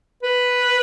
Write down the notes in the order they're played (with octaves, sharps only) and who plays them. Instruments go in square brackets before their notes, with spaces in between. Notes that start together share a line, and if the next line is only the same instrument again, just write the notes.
[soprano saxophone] B4